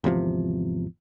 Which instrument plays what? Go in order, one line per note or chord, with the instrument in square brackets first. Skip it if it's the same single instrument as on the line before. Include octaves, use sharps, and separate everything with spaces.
[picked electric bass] G#1 E2 C3 F3